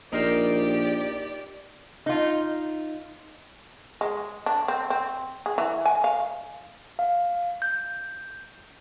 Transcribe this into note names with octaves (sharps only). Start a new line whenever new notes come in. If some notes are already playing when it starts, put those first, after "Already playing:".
A#1 D#4 G4 A#4 C5 D5
D#4 F4
G#3
D4
C4
C4
G#4
E3
G#5
F5
F5
G6